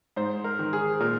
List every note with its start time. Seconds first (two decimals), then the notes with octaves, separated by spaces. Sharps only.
0.16 G#2 C5
0.44 A#4
0.59 D#3
0.73 G#4
1.00 A#2 A#4